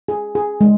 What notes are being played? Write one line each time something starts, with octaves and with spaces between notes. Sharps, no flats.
G#4
G#4
G#3